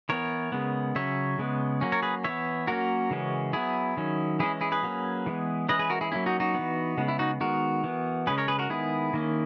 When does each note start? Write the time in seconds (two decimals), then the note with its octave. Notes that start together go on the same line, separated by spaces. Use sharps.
0.09 E3 B3 A#4 C#5
0.52 C#3 G#3 B3
0.95 C#3 F#3 C#4 C#5 E5
1.39 C#3 G#3 B3
1.81 F#3 A#3 C#4
1.92 A#4 C#5
2.03 G#4 B4
2.24 E3 B3 C#5 E5
2.67 F#3 A#3 C#4 F#4 A#4
3.10 C#3 E3 G#3 C#4
3.53 F#3 B3 E4 G#4
3.97 D#3 F#3 C#4
4.39 E3 G#3 C#4 E4 G#4
4.61 E4 G#4
4.72 G#4 B4
4.83 F#3 A#3 C#4
5.26 E3 G#3 B3
5.69 E3 G#3 C#4 B4 D#5
5.79 G#4 B4
5.90 F#4 A#4
6.01 E4 G#4
6.12 F#3 A#3 C#4 E4
6.26 D#4 F#4
6.40 D#4 F#4
6.55 E3 B3
6.98 C#3 G#3 B3
7.08 E4
7.19 D#4 F#4
7.40 D#3 G#3 B3 F#4 A#4
7.84 E3 B3
8.27 C#3 G#3 C#4 G#4 B4
8.38 A#4 C#5
8.48 G#4 B4
8.59 F#4 A#4
8.70 D#3 G#3 B3 E4 G#4
9.13 D#3 A#3 C#4